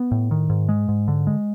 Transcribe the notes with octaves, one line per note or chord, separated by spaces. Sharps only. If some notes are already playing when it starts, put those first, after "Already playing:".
Already playing: B3
A2
D#3
G#2
G#3
G#2
D3
G#3